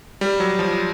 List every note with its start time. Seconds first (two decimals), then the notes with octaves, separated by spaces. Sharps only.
0.21 G3
0.40 F#3
0.59 F3